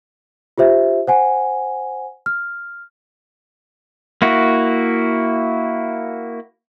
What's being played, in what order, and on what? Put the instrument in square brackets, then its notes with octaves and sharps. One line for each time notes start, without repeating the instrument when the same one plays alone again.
[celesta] F4 G4 C5 E5
C5 F#5 G#5
F6
[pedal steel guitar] A#3 E4 F#4